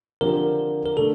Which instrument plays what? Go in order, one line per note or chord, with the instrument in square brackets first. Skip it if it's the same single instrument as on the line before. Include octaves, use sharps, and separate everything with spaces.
[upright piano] D3 F3 C4 G4 [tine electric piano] A#4
[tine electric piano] A#4
[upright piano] D3 A3 [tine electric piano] A4